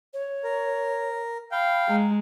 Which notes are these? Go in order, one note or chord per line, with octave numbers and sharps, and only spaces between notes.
C#5
A#4
F5 G5 B5
G#3 A#5